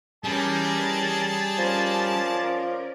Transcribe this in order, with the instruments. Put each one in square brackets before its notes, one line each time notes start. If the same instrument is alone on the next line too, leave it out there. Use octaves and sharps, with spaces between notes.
[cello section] E3 C#4 A#4 [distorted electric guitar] G3 [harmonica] G#4 A5
[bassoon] F3 [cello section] C#4 A#4 D5